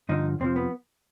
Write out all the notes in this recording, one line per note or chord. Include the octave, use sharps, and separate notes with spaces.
G2 D3 F3 D#4
F2 C3 F3 C4
B3